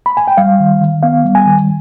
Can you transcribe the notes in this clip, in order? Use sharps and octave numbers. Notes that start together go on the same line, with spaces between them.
B5
G#5
G5
G3 F5
D#3
D#3
B3 F5
G3
G#5
D#3